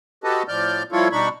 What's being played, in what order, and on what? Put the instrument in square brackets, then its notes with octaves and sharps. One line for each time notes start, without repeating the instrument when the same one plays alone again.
[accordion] F#4 G4 A4 B4 D#5 A5
A2 F3 D5 F6 G6
F3 G3 E4 F4 A4 C#5
B2 G3 D4 D#4 B5 C#6